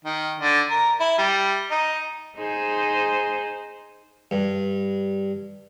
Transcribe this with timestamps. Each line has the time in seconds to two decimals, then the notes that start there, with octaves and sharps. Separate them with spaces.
0.04 D#3
0.40 D3
0.70 A#4
1.00 E4
1.18 G3
1.71 D#4
2.37 D#4 G#4 C5
4.31 G2